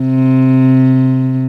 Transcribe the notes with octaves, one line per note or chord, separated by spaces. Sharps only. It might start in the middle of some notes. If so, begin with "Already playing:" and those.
Already playing: C3